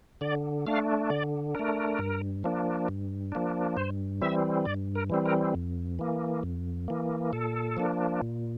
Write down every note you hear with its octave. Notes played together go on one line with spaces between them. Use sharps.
D3 D5
A3 D4 F5
D3 D5
A3 D4 A#4
G2
F3 A#3 D4
G2
F3 A#3 D4
G2 C5
E3 G3 C4 E5
G2 D5
A#4
E3 G3 C4
A#4
F2
E3 A#3
F2
E3 A#3
A#2 A4
F3 A#3 D4
A#2